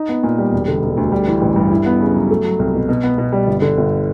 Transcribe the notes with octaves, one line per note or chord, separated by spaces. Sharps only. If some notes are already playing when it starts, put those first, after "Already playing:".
Already playing: D#4
B3
A#2
G3
E1
D3
E1
D2
G3
E3
A1
G2
E4
B3
C#3
F#3
A3
F#3
C2
B2
B2
B3
B2
G3
G1
D3
G1